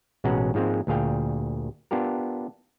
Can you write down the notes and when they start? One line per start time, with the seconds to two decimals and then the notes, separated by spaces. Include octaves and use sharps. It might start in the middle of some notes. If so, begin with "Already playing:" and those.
0.24 A1 B2 G#3 C#4 F#5 A#5
0.54 G#2 F3 G#3 A#3 C4
0.87 D2 A#2 G#4 F5 G5
1.91 B3 D4 F4 G4 A#4